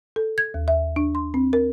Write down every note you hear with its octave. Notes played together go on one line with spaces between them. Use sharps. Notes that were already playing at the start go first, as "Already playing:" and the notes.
A4
G#6
D#2
E5
D4
C6
C4
A#4